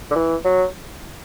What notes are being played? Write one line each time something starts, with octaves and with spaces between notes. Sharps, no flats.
D3
E3
F#3